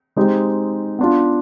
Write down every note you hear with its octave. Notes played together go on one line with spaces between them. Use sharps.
G#3 C4 D#4 G4
B3 D4 F4